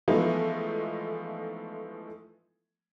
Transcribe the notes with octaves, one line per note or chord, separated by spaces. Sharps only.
E3 F3 G#3 A3 B3 D#4